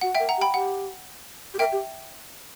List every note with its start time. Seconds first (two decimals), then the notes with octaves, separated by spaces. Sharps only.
0.01 F#4 F#5
0.15 E5 G5
0.20 A#4
0.29 F#5 A#5
0.38 G4
0.41 G5 B5
0.54 G4 F#5
1.54 G4
1.59 A#4 E5 G5
1.72 G4